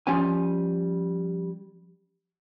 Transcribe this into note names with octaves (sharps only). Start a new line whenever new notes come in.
F3 G3 C#4 G#5